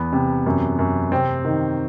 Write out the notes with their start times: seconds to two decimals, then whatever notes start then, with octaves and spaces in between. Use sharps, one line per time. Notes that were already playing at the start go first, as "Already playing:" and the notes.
Already playing: E2 B3
0.13 C3
0.46 F#2
0.79 F#2
1.12 C3 C4
1.45 D#3